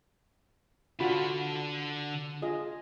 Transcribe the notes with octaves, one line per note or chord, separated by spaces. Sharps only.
D3 F4 F#4 A4 B5
F4 G#4 D#5